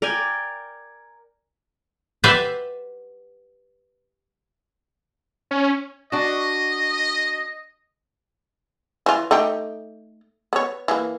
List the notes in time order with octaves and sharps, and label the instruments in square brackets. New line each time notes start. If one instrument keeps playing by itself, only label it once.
[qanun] A#4 D5 G5 G#5
[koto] G4 B4 C5 D5 E5 F#5
[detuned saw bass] C#4
[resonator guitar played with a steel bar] D4 F#4 [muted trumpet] D#5
[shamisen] E3 F4
A3 D#4 G4
B3 C#5
E3 A#3